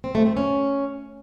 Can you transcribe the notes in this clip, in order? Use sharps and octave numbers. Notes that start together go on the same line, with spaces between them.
C4
A3
C4
C#4